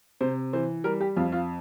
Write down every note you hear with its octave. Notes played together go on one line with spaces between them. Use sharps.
C3 C5
E3 C5
G3 A#4
G4
F2 F4
F4